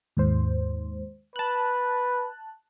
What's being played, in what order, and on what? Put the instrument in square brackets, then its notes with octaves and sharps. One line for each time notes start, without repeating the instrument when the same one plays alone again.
[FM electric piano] D#2 G#2 C5
[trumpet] B4 [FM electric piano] A5 F#6